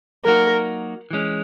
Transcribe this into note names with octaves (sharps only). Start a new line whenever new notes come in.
F#3 A#3 D#4 F#4 A#4
E3 G#3 C#4